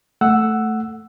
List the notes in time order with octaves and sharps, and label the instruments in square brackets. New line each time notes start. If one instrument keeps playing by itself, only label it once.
[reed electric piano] A3 F#5 E6